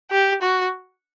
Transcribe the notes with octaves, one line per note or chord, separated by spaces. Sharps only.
G4
F#4